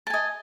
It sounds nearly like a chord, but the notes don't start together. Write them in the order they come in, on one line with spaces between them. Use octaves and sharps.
A5 G#5 D#5